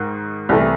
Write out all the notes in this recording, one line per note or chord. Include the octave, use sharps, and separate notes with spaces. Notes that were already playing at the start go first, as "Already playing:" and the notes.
Already playing: G#2 D#3
C2 C3 E3 A3